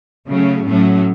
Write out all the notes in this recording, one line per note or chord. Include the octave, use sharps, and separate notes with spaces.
C#3 F#3 A3 C#4
A2 F#3 A3 C#4